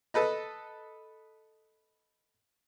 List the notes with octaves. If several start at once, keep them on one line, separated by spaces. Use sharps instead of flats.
A4 B4 D#5